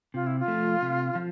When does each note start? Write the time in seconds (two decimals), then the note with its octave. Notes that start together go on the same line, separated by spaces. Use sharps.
0.14 C3 F4
0.27 E4
0.39 F4
0.48 F3 A3
0.82 C3
1.15 F3